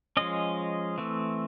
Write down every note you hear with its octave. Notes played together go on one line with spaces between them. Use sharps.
F3 G#3 C#4 D#5
E3 A3 C4